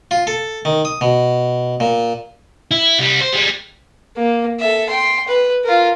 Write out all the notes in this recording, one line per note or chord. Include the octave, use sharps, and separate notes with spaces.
F4
A4
D#3
D#6
B2
A#2
E4
C2 G3
C5
G3 G#3
A#3
A4 E5
G5 C6
B4
F4 A#4